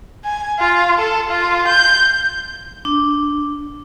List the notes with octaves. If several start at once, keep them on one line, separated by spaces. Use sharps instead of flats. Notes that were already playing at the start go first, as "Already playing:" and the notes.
G#5
F4
A4
F4
G6
D4